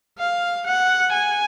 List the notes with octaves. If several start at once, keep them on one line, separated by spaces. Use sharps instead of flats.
F5
F#5
G#5